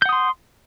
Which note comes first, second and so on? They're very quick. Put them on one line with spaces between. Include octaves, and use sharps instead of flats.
G6 F#5 D#6 C6